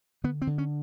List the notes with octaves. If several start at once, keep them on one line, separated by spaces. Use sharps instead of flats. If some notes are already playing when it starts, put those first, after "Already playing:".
D3 B3
C4
D3
C#4